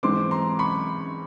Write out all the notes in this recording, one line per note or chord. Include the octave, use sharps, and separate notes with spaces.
G#2 E3 G#3 C4 C6 D6
A#5 C6
B5 C#6